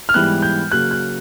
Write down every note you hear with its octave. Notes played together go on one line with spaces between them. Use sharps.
F6
G#2 E3 G3 B3 F#6
G6
C#3 F#3 A#3 F#6
F#6